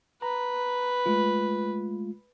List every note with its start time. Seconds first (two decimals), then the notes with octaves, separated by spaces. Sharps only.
0.22 B4 A#5
1.06 G#3 A3 F4